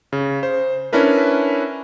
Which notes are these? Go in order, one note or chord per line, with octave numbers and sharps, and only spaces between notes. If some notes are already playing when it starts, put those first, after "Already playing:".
C#3
C5
C#4 D4 E4 A#4 B4